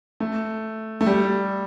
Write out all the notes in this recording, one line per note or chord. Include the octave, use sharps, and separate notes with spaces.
A3
A3
G3